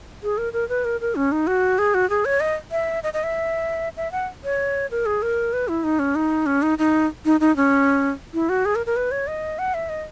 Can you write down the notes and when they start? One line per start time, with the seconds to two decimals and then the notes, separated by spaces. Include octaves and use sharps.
0.23 G#4
0.38 A#4
0.53 A#4
0.69 B4
0.85 A#4
1.01 A#4
1.15 C#4
1.32 D#4
1.47 F#4
1.79 G#4
1.94 F#4
2.10 G#4
2.25 C#5
2.40 D#5
2.71 E5
3.03 D#5
3.14 D#5
3.23 E5
3.97 E5
4.12 F#5
4.44 C#5
4.91 A#4
5.06 G#4
5.22 A#4
5.53 B4
5.68 E4
5.84 D#4
5.99 C#4
6.15 D#4
6.46 C#4
6.62 D#4
6.78 D#4
7.25 D#4
7.40 D#4
7.56 C#4
8.34 E4
8.49 F#4
8.65 G#4
8.75 A#4
8.86 A#4
8.96 B4
9.11 C#5
9.27 D#5
9.59 F#5
9.74 E5
9.89 D#5